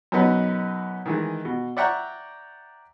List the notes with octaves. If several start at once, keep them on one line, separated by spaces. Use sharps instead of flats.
F#2 B2 B3 D#4 B4
D#3 E3 G#3
B2
D5 E5 F#5 G5 A#5 C#6